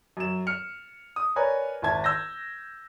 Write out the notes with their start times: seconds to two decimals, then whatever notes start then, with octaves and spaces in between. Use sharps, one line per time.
0.17 F#2 E7
0.47 F6 C#7
1.16 D#6
1.36 A#4 B4 C#5 D5 G#5 A#5
1.82 G#1 E4 A5 G#6
2.04 E6 G6 A#6